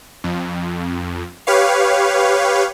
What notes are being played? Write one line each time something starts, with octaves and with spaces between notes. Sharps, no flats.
F2
G4 B4 C#5 F5